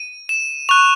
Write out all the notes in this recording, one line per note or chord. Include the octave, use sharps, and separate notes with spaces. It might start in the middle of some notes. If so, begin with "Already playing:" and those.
Already playing: D#7
E7
C#6 F#6 F7